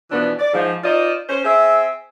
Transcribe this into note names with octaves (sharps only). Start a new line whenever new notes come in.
B2 E3 F3 B3 D4
D5
G#2 F3
D#4 F4 C5 D5 D#5
C#4 C5
C4 G#4 E5